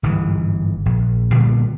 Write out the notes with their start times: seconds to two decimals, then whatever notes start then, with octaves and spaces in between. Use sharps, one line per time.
0.03 G1 G#2 E3
0.86 A#1
1.33 A#2 D3 G3 B3